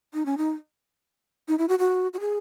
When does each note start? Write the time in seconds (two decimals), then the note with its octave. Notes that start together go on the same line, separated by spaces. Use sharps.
0.14 D#4
0.26 C#4
0.38 D#4
1.48 D#4
1.59 E4
1.69 F#4
1.79 F#4
2.14 F#4
2.20 G#4